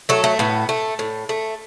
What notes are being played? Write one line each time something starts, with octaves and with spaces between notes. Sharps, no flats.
F#3 A3 A4
A3
A2 B3
A3
A2
A3